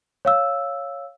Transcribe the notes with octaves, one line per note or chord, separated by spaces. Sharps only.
C#5 F5 E6